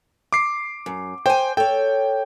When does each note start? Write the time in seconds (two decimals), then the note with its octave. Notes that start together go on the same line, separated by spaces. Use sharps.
0.33 D6 C7
0.86 F#2
1.26 C5 G5 G#5
1.57 A4 C#5 G5